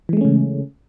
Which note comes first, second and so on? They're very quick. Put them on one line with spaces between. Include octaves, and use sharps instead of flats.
E3 G#3 A3 C#4 C#3